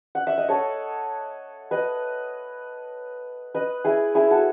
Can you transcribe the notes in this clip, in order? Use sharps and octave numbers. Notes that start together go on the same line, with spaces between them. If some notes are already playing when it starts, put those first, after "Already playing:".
F#5
E5
D#5
A4 C#5
B4 D#5
B4 D#5
E4 G#4
E4 G#4
F#4 A4